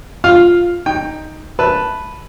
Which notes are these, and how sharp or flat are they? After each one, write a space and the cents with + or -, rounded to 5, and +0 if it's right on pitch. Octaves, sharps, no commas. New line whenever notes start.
F4 +0 F5 +5
D#4 +0 G5 +15
B4 +0 E5 +0 A5 +0